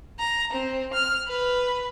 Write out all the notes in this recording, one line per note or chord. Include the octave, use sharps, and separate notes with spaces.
A#5
C4
F6
B4